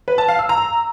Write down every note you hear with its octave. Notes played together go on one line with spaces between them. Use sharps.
B4
A5
F5
E6
A#5